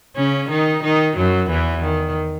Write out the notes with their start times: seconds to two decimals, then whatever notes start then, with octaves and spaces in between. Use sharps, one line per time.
0.16 C#3 C#4
0.49 D#3 D#4
0.83 D#3 D#4
1.16 F#2 F#3
1.49 E2 E3
1.83 D#3